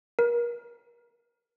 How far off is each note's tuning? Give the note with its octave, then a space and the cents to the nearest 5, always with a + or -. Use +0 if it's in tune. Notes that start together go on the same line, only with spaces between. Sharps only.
A#4 +35